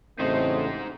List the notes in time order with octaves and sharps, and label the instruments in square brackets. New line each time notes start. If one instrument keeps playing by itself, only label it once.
[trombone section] A1 C#3 A3 [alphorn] C4 [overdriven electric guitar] D#4 C5